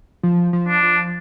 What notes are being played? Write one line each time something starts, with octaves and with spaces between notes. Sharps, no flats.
F3
F3
D4
F3